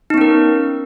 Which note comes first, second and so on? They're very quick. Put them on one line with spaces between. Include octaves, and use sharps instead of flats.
D#4 B3 C#4 A#4